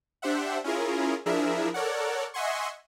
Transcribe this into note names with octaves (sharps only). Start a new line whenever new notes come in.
D4 G4 C5 E5 F#5
C#4 E4 F4 G#4 A#4
F3 D4 E4 G#4 A#4 E5
A4 A#4 C#5 D5 F#5
D#5 E5 F#5 G#5 C6 C#6